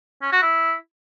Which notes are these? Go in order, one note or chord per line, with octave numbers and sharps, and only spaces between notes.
C#4
F#4
E4